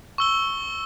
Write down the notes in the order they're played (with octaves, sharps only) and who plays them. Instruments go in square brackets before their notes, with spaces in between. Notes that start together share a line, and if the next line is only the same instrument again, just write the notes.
[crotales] C#6 E6 G7